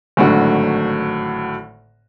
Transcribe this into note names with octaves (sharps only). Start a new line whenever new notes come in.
G#1 A2 D3 F#3